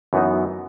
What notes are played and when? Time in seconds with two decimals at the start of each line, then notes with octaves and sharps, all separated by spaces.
0.13 F#2 E3 B3 D#4